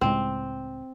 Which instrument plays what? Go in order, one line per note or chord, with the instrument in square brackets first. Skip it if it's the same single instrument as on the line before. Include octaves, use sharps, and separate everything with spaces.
[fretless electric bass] C#2 A2 G#3 [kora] C4